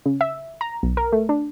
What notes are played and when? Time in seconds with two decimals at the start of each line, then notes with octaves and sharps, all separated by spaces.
0.06 C#3
0.21 E5
0.61 A#5
0.83 B1
0.97 A#4
1.12 A3
1.29 D4